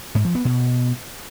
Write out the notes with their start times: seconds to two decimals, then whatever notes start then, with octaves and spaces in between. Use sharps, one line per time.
0.15 G#2
0.25 F3
0.35 B3
0.45 B2